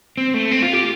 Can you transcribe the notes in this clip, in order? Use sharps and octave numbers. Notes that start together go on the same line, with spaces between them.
C4
A3
C4
F4
G4